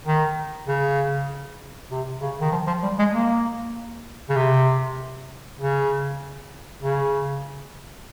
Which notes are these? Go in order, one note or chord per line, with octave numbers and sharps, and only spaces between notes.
D#3
C#3
C3
C#3
D#3
F3
F3
G3
G#3
A#3
C#3
C3
C#3
C#3